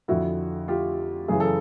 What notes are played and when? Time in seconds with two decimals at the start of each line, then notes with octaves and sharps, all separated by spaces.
0.08 F2 D3 E4 F#4
0.68 F4 G4
1.28 F#2 C#3 E3 G#4
1.40 A4